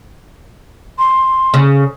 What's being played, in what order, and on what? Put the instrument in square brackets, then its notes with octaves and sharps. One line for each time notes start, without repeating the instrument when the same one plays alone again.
[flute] C6
[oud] C#3